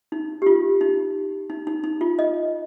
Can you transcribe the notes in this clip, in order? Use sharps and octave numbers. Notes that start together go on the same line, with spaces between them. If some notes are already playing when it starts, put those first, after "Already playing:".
D#4
G4
F4
D#4
D#4
D#4
D#4
F4
D#5